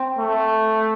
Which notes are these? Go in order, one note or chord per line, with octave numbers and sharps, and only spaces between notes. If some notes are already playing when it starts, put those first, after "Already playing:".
Already playing: C4
A3